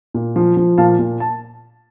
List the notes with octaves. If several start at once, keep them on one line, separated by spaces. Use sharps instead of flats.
A#2
F3
F3
A#2 F5 A5
A#2
A5